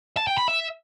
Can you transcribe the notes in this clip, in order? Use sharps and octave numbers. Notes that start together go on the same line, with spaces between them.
A5
G5
B5
E5